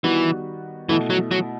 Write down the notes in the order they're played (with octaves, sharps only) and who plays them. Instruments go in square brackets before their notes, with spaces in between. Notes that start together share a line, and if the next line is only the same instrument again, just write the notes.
[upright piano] D#3 G3 B3 F#4 [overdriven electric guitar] E3
[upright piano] B2 A3 E4 [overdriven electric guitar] E3
[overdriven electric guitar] F#3
F#3